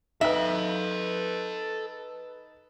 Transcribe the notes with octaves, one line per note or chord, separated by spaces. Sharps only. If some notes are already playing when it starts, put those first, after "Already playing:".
D#4 A4 B4 E5 F5